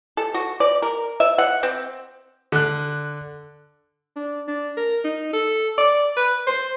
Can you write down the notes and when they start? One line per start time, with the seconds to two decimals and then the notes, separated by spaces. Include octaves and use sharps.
0.17 A4
0.34 F#4
0.60 D5
0.82 A#4
1.20 E5
1.38 F#5
1.63 C4
2.52 D3 F#6
4.16 D4
4.48 D4
4.77 A#4
5.04 D#4
5.33 A4
5.78 D5
6.16 B4
6.47 C5